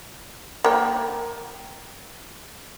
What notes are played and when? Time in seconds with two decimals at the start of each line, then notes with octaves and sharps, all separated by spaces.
0.64 A#3 G5